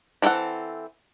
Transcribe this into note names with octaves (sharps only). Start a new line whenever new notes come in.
E3 G#3 C4 A4 F#5